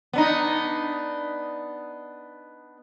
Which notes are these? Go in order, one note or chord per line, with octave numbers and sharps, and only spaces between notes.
B3 D4 D#4